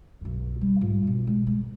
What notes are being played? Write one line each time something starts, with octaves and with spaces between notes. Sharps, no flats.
B1 F#2
G3
G#2 F4
B2 F#3
G#3
G#3